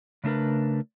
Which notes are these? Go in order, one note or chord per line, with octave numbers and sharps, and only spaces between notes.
C#3 A3 D4 A#4 B4